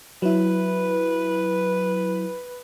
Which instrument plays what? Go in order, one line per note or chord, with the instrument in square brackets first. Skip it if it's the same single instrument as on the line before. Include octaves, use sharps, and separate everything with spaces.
[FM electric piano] F#3 E4 [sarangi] B4